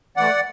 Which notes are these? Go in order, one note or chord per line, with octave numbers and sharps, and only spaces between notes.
E3 A3 D5 F#5